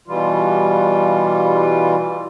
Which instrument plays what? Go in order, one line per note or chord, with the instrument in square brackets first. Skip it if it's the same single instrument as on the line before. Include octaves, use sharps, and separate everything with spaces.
[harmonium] B2 E3 G3 F4